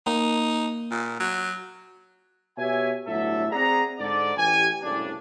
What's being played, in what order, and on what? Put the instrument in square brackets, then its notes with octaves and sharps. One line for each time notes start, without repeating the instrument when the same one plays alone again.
[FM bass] A#3 [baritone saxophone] D#4
[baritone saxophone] A#2
F#3
[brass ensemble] B2 G4 C#5 E5 G#5
G1 A2 F#3 D4 A4 E5
C4 G#4 D5 F#5 A#5
G#2 D3 D5
A1 G4 G#5
F#1 C2 A2 C#3 D4